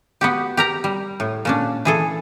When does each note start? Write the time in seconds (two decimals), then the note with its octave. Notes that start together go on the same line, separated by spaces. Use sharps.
0.21 B3 F#4 G4
0.57 G4 A#4 A#5
0.84 G3
1.20 A2
1.45 A#2 C#4 D4
1.85 E3 G#4 A4